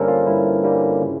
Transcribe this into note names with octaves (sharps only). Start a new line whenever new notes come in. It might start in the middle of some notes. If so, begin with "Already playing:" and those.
Already playing: G2 D3 G3 A#3 C#4 A4 A#4 C5
F4
G2 E4
D3 G3 A#3 C#4
C#3